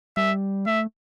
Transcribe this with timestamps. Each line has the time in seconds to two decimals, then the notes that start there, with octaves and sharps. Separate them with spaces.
0.17 G3 E5
0.66 A3 E5